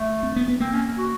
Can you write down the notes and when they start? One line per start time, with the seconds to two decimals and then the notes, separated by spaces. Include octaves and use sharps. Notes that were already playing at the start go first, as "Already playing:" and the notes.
Already playing: A3
0.23 C4
0.36 B3
0.48 B3
0.60 A#3 C4
0.73 C#4
0.98 F#4